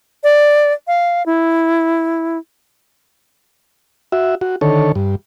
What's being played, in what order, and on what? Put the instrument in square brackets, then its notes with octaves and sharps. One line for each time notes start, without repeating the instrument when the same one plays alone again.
[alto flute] D5
F5
E4
[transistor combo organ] F#4 E5
F#4
D3 D#3 A4 C#5
G2